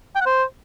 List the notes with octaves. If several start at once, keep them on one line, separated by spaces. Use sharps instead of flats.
G5
F#5
C5